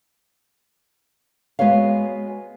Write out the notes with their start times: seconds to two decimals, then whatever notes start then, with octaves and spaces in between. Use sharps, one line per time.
1.59 G#3 B3 F#4 C#5 F5